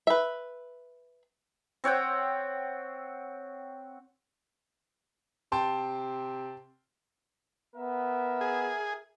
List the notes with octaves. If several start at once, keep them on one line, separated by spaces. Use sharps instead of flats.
B4 E5
C4 C#5 F#5 G5
C3 G5 A5 C6
B3 A#4 E5
G#4